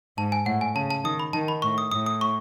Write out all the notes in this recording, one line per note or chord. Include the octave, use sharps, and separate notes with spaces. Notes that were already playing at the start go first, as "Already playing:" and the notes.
G#2 A5
G#5
A2 F#5
G#5
C#3 A5
A5
D#3 D#6
B5
D#3 A5
B5
A2 C#6
D#6
A2 D#6
D#6
C#6